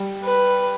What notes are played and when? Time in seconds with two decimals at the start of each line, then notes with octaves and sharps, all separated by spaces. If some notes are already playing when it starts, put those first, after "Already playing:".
Already playing: G3
0.24 B4